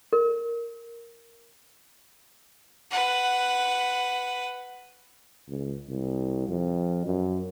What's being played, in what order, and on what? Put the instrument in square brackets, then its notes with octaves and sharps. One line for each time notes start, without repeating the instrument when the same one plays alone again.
[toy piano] A#4
[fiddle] B4 F#5
[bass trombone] C#2
C2
F2
F#2